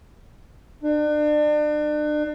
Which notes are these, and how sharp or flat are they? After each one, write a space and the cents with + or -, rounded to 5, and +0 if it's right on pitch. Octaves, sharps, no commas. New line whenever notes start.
D4 +35